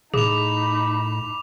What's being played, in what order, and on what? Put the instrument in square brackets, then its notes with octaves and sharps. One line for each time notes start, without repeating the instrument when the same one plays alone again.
[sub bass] A2 [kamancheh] D#4 B5 [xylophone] G#4 [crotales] D6 F7